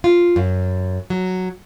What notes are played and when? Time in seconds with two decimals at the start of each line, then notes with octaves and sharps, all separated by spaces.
0.04 F4
0.36 F#2
1.10 F#3